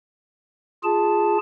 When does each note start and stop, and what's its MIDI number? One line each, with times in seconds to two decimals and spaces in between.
0.84 1.38 65
0.84 1.38 68
0.84 1.38 81